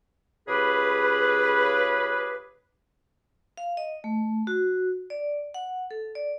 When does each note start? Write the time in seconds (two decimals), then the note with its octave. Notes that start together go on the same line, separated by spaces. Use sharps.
0.48 C#2 C#3 G4 G#4 B4
3.58 F5
3.77 D#5
4.04 A3
4.47 F#4
5.10 D5
5.54 F#5
5.91 A4
6.15 D5